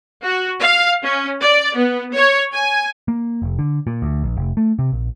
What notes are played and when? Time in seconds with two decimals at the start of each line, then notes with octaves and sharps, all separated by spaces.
0.23 F#4
0.61 F5
1.03 C#4
1.42 D5
1.76 B3
2.14 C#5
2.54 G#5
3.08 A#3
3.42 F1
3.59 D3
3.87 A#2
4.02 D2
4.23 A#1
4.37 F1
4.57 A3
4.79 C3
4.92 A#1